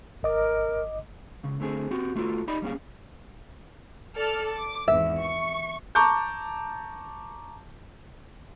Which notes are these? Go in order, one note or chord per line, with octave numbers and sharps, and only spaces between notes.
G#1 A#4 D#5 D6
C#2 C#3
D3 A3 C4 G#4
C4 F#4 G4
A3 F4 F#4 A4
D#4 G4 D5 D#5 B5
G3 A#3 C#4 G#4 F5
A4 D5 F6
D6
G#1 E2 E5
C#6
A5 A#5 C#6 D6 G6